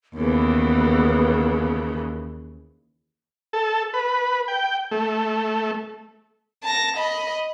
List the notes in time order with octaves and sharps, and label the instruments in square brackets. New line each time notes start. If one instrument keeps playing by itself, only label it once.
[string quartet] D#2 C#3 E3 [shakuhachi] B3
[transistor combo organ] A4
B4
G5
A3
[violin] A5 A#6
D#5 B5